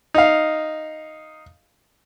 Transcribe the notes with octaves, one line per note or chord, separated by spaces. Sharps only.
D#4 F5